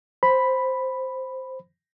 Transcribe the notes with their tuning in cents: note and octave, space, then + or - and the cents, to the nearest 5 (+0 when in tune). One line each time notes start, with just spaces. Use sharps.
C5 +0 B5 +0